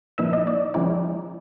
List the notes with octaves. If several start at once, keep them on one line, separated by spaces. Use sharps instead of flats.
A#2 F3 A#3 D#4 E4 E5
D#5
D5
F3 G#3 C#4 E4 D5